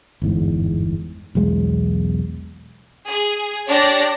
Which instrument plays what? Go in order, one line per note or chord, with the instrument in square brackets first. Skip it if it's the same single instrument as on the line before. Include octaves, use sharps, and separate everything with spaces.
[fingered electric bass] G1 E2 G#2
B1 E2 G#3
[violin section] G#4
D4 G4 C#5 D5 A#6